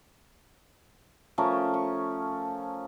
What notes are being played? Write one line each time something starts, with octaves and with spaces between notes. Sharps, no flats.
F3 A3 C#4 A#4
C#6